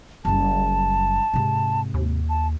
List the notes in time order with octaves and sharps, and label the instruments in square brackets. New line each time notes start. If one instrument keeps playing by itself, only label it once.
[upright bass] F#1 G3 [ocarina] A5
[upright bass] G#2 C3
[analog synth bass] D#2
[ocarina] A5